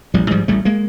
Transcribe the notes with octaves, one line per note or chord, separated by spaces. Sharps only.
A1 F3 G3
G#2 F3 G3
A1 G3 A3
G#3 A#3